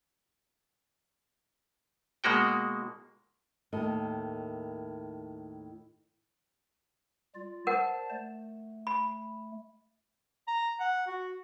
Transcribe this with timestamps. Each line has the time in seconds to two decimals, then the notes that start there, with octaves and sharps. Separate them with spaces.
2.24 B2 G#3 A#3 F#4 G5
3.72 D#2 A2 D#3 D#5
7.35 G3 F4 D5
7.67 A#4 C5 D5 F#5 A5
8.10 A3
8.87 B5
10.48 A#5
10.80 F#5
11.07 F#4